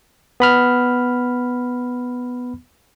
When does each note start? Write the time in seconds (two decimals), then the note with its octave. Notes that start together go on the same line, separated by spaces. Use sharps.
0.40 B3 B5 F6